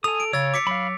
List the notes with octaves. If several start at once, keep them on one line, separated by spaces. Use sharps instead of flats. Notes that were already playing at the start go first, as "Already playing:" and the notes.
A4 G#5 D#6 F7
D7
C#3 C#5 E6 A6
D6 B6 C#7
F#3 F5 B5